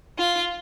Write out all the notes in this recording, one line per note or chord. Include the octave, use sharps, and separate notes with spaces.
F4